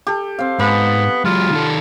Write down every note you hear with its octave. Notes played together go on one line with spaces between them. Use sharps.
G4 A4
C4 F5
G#2 B3 B5
F#3 G#3 F4
D#3 A4